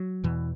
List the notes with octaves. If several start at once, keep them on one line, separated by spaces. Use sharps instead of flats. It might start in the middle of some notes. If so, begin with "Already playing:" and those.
Already playing: F#3
E2 B2 E3